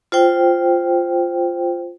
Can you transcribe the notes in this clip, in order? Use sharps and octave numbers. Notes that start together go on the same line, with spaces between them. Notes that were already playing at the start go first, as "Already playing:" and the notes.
F4 C5 G5